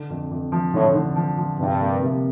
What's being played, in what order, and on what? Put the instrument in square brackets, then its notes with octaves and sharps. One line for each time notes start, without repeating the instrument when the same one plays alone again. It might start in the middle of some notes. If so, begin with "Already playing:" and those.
Already playing: [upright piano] D3
F2
F2
F3
[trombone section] A2 [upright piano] D3
[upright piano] D3
F3
F3
[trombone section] G2 [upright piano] C3
[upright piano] A#3
C3